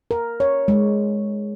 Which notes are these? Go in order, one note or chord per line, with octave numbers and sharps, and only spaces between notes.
A#4
C#5
G#3